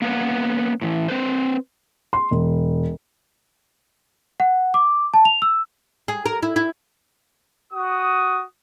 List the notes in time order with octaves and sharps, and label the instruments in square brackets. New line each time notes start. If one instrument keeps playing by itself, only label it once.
[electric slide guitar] A#3 B3 C#4 F#5
A2 E3
C4 B4 C5
[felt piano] C6
E1
[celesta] F#5
D6
A5
F7
E6
[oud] G#4
A#4
E4
E4
[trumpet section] F#4 D#6